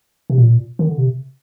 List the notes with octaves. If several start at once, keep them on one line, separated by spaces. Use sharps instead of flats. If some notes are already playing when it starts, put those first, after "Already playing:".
C3
A#2
D#3
D3
C3